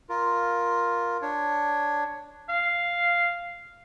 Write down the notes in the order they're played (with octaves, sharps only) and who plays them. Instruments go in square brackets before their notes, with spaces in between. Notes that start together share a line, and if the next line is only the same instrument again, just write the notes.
[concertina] F4 A#4
D4 C#5
[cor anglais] F5